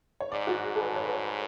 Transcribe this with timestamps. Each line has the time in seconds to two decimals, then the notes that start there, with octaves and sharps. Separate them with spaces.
0.20 C#5
0.31 G#2 D5
0.47 F#4
0.64 G#4
0.76 A4
0.80 B4
0.96 C#5
1.05 B4
1.13 C#5